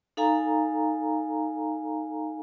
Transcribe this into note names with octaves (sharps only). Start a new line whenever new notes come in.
D#4 A4 F5 G#5 A#5